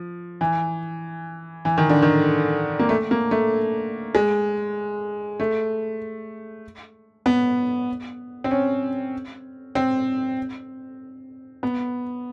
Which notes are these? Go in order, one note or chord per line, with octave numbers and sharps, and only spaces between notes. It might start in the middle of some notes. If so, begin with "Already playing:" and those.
Already playing: F3
E3
E3
D#3
D3
D#3
A#3
A3
A#3
A3
G#3
A3
B3
C4
C#4
C4
B3